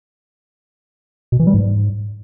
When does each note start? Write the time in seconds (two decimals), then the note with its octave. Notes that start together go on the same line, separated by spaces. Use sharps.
1.32 B2
1.40 E3
1.47 G3
1.54 G#2